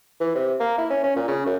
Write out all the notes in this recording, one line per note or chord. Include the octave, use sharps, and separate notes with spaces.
E3
C3
A#3
E4
C#4
C#4
A#2
C#3
F#2